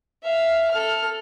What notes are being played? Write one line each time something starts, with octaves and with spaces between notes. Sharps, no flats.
E5 F5
A4 F6